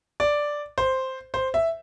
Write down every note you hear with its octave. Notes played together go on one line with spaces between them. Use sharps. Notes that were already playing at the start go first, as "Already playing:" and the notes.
D5
C5
C5
E5